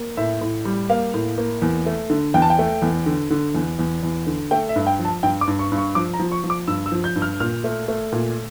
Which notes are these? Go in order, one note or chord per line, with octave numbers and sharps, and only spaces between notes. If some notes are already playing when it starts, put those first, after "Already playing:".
Already playing: A#3
A2 E5
A2
G3
A#3 F5
A2
A#3
E2
A3
D3
E2 G5
A5
G5
A3
E2
D3
D3
E2
E2
E2
D3
A3 G5
E5
G2
G5
F3
A5
G2 G5
D6
G2
C#6
G2
C#6
F3 D6
A#5
F3
C#6
F3
D6
G2 E6
E6
F3
G6
G2
F6
A#2 F6
A3
A3
A#2